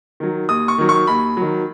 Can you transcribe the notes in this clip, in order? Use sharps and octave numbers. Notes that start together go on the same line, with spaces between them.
D#3 F#3
D#2 D#6
C#6
D#3 F#3
C#6
D#2 B5
D#3 F#3